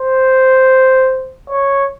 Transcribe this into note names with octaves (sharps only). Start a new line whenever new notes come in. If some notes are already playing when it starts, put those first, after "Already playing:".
Already playing: C5
C#5